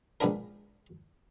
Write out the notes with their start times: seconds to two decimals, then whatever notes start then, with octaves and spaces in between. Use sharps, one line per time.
0.21 A#1 G#2 B3 D4 A#4